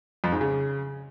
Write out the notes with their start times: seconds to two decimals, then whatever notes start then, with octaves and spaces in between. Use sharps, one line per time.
0.24 F2
0.32 G#2
0.41 C#3